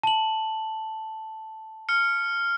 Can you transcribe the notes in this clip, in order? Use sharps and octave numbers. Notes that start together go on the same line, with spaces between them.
A5 F#7
F6 C#7